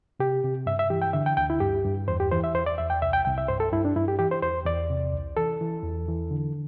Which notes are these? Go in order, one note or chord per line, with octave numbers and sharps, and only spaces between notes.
C3 G4
C3
G2 E5
E5
E3 G4
G5
D3 E5
G5
D2 G5
E4
G2 G4
G2
E2 C5
G4
E3 C5
E5
E2 C5
D5
E2 E5
G5
C2 E5
G5
C2 G5
E5
G2 C5
A4
G2 E4
D4
G2 E4
G4
E3 G4
C5
E2 C5
E2 D5
C3
C2
E3 A4
E3
E2
E3
D3